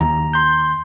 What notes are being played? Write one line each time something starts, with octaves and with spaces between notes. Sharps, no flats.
D#2 A#5
C6 G6